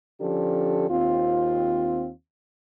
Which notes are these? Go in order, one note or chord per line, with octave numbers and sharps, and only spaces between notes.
D3 F3 C#4 D4 G4 A4
D#2 C4 F4